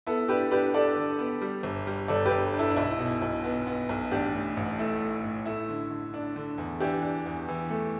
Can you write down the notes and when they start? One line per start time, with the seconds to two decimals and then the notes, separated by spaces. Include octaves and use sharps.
0.07 B3 E4 A4
0.29 D4 G4 B4
0.51 D4 G4 B4
0.74 D4 A4 D5
0.96 D3
1.19 B3
1.42 G3
1.63 G1
1.87 G3
2.08 G1 A4 D5
2.26 G4 B4
2.31 G1
2.54 D4
2.59 E4 A4
2.71 D4
2.76 B1 E4
2.99 B2
3.22 B1
3.44 B3
3.67 B3
3.89 B1
4.11 A1 D4 G4
4.34 A2
4.57 A1
4.78 A3 E4
5.01 A3
5.24 A2
5.46 A3 E4
5.69 D3
5.90 D3
6.14 D4
6.36 D3
6.58 E2
6.80 E3 D4 G4
7.03 D4
7.26 E2
7.49 E3
7.70 A3